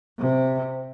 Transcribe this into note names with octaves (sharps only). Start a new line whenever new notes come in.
C3